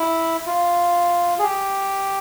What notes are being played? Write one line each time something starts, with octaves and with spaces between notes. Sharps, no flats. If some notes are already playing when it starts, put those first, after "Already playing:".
Already playing: E4
F4
G#4
G4